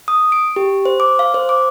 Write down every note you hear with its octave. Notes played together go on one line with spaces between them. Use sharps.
D#6
D7
G4
C5
D6
F5
C5
D6